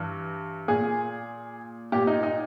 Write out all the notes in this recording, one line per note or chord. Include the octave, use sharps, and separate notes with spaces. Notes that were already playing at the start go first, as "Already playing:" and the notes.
Already playing: G2 E3
A#2 G#4
A#2 G4
D#4
D#4